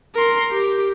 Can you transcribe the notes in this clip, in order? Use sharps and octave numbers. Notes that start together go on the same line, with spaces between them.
A#4 C6
G4